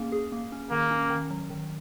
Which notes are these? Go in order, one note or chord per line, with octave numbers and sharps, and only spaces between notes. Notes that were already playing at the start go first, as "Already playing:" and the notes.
Already playing: A#3 C#4 G#4
G#4
A#3
C#4
D#3 A#3
C#4
D#3
F#3
D#3